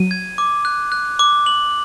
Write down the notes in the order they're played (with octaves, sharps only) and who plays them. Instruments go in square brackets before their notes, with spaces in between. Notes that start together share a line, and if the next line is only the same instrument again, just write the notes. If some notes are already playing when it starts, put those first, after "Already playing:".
Already playing: [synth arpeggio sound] F#3 [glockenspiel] D#7
[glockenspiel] G#6
D6
F#6
F#6
D6
F#7